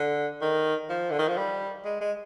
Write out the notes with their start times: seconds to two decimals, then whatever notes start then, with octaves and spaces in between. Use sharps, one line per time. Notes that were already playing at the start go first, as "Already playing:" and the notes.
Already playing: D3
0.41 D#3
0.89 F3
1.11 D3
1.19 D#3
1.28 F3
1.37 G3
1.85 G#3
2.01 G#3